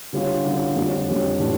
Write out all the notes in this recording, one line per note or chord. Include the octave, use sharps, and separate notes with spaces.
D3 G3 C#4 F4
D3 G3 C#4 F4
F2 D3 G3 C#4 G4
F2 D3 G3 C#4 G4
A2 E3 G3 D4